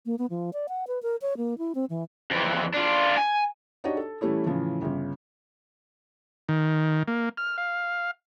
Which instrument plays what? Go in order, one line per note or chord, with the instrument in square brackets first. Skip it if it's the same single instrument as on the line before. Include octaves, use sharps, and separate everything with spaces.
[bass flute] A#3
B3
F3
D5
F#5
B4
A#4
C#5
A#3
E4
C4
E3
[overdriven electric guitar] F2 E3
D4 F4
G#5
[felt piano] D4 D#4 F#4 G4 C#5 D#5
A4
E3 G3 A3 C#4 E4
A2 C#3 E3 F3
G1 C#3
[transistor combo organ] D#3
A#3
F6
F5